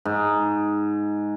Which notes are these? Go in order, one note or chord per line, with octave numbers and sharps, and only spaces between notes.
G#2